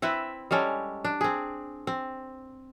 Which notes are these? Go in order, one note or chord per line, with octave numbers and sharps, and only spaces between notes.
C4 E4 B4 E5
G3 G#3 C#4 A4
D4
C4 G#4
C4